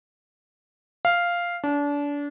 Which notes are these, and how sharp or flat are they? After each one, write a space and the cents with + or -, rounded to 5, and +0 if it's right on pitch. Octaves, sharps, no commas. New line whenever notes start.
F5 -5
D4 -30